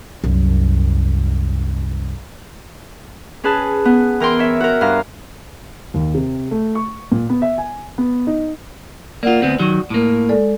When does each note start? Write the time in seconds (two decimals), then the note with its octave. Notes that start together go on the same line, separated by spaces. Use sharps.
0.24 C2 F#2
3.44 C#4 G#4 B4 A5
3.85 B3
4.20 E3 A#4 G5 C6
4.39 C#5 E5
4.60 F#4 A#4
4.81 G2 F5 A#5
5.94 D#2
6.14 C3
6.51 A3
6.75 C#6
7.12 A#2
7.30 B3
7.42 E5
7.58 G#5
7.98 B3
8.27 D#4
9.23 A#3 F4 D5 F#5
9.42 D2 B3 C4
9.59 D#3 F#3
9.90 A2 A#3
10.29 G#3 A4 D5